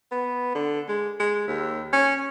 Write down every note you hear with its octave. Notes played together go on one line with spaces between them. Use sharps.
B3
D3
G#3
G#3
D#2
C#4